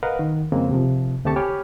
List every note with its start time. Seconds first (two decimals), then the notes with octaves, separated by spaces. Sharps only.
0.03 A#4 B4 D#5 F5 F#5
0.19 D#3
0.52 F2 C#3 G#3 A#3 C4
0.71 C3 F3
1.25 D2 A3 C4 G4 A5 C#6
1.36 G4 C#5 G#5 B5 F6